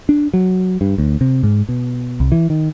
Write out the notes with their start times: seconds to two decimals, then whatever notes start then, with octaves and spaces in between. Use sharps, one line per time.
0.09 D4
0.34 F#3
0.81 G2
0.98 D2
1.21 C3
1.43 G#2
1.69 B2
2.20 C2
2.32 E3
2.50 D#3